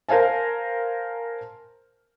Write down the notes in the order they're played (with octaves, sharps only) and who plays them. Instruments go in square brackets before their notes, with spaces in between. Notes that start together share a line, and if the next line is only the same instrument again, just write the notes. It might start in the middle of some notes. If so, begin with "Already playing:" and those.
[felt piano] A#4 C5 F5 G#5 A5